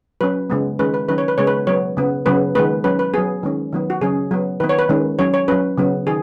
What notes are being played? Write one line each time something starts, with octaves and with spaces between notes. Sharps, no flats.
F#3 C#4 B4
C#3 G#3 B3
D#3 G#3 C#4 B4
B4
D#3 F#3 C#4 B4
C#5
B4
C#3 G#3 B3 C#5
B4
F#3 B3 C#5
C#3 B3
C#3 F#3 B3 B4
D#3 G#3 B3 B4
F#3 C#4 B4
B4
F#3 B3 G#4
D#3 G#3 C#4
D#3 F#3 B3
F#4
C#3 F#3 C#4 G#4
F#3 B3
D#3 B3 B4
C#5
B4
D#3 G#3 C#4
F#3 C#4 C#5
C#5
F#3 C#4 B4
C#3 F#3 B3
D#3 G#4